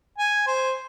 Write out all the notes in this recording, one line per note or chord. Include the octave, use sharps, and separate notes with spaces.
G#5
C5